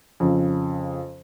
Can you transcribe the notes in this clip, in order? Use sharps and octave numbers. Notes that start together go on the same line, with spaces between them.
F2 C#3